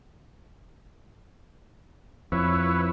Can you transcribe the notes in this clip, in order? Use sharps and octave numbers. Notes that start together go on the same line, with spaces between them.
F2 F3 E4 B4 C#5